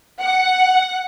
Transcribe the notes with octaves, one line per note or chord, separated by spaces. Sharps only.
F#5